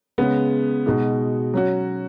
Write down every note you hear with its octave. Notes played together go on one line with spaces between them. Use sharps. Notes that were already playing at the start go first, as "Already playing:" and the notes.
C#3 G#3 B3
B2 G#3 D#4 F#4
F#3 C#4 F#4